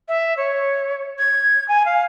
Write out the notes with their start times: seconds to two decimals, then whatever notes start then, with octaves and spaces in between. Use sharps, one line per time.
0.08 E5
0.37 C#5
1.18 G#6
1.68 G#5
1.86 F5